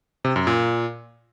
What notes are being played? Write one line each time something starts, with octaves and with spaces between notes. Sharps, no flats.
C3
F#2
A#2